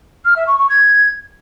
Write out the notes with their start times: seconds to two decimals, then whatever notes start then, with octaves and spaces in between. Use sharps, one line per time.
0.25 F6
0.36 E5
0.47 C#6
0.58 C#6
0.69 G#6